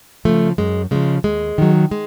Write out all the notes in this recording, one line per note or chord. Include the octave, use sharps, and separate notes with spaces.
C#3 F3 A3
F#2 G#3
C#3 F3 G#3
D#2 G#3
D#3 F#3
G#3